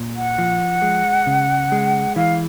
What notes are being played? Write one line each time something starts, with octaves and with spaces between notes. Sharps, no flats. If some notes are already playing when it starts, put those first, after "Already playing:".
Already playing: A#2
F#5
F3
G#3
C#3
G#3
E3 F5